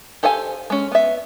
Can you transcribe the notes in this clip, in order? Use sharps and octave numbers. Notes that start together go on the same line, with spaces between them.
G4 A4 C5 F5 G#5
G#3 C#4
B3 E5